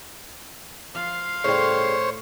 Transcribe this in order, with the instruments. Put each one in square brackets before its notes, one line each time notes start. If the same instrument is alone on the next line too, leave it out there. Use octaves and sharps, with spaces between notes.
[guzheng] F3 [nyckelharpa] F5 C6
[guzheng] A2 [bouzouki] C#3 G3 [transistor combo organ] C5 C#5